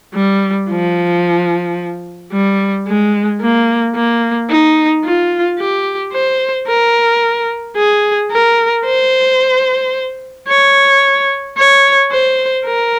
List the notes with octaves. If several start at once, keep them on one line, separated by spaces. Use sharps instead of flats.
G3
F3
G3
G#3
A#3
A#3
D#4
F4
G4
C5
A#4
G#4
A#4
C5
C#5
C#5
C5
A#4